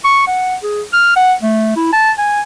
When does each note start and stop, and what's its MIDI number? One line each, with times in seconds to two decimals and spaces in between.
0.04 0.23 85
0.27 0.55 78
0.63 0.81 68
0.93 1.14 89
1.16 1.33 78
1.42 1.72 57
1.76 1.90 64
1.92 2.11 81
2.18 2.41 80